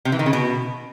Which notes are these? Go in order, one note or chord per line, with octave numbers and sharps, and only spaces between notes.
C3
E3
D#3
C#3
B2